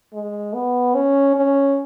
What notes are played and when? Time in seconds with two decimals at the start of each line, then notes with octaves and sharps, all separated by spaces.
0.13 G#3
0.54 B3
0.95 C#4
1.36 C#4